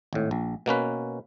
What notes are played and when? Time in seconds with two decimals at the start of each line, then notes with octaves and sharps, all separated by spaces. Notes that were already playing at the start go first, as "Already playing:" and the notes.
0.13 G#1 A2
0.31 A#1
0.66 B2 A#3 C#4 B4